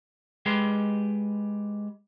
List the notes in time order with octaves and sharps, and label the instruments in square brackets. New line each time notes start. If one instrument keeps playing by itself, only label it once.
[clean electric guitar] G#3 G4 B4 C6